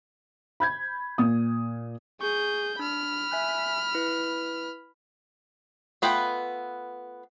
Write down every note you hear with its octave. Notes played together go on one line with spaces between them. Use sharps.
B5 G6 G#6
A#2 D#6
G#4 C#6 G6
D4 B5 F6
E5 G#5 F#6
E4 B4
A3 B3 F4 B4 G5